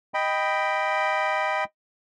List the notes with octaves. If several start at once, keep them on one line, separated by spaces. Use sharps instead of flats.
D#5 G5 B5